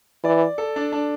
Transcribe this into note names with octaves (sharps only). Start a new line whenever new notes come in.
E3 D5
A4
D4
D4